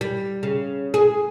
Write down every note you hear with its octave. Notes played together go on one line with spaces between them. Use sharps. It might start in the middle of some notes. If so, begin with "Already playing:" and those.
G3
C#3
G#4